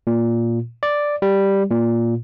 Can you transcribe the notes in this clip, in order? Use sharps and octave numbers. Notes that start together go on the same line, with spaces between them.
A#2
D5
G3
A#2